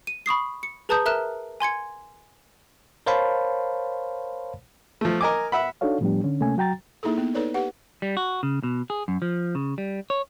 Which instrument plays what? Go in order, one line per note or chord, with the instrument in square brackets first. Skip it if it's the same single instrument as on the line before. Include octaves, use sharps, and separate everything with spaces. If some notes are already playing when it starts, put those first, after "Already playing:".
[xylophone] D#7
B5 C#6 D#6 C7
C#7
G#4 B4 A5 A#5 D#6 G6
A#4 E5 A#5 F6 F#6 E7
G#5 C6 G#6 C#7
[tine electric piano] A#4 C5 C#5 F5 A5 B5
[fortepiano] F3 A3
A#4 D#5 G#5 D6
E5 F#5 B5
[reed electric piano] D4 D#4 F#4 A4 C#5 F5
A2 F3 G3 B3 D4 G4
D3 C#4
C3 A3 A#3 C#4 G#5
F#3 F#4 G5 A#5 A6
[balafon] A#3 D#4 E4 G#4 A4
B3 D#4
D#4 A4 B4 C#5 D5
G4 B4 F#5
[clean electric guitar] G3
F#4
C#3
B2
G#4
F#2
F3
C#3
G3
C#5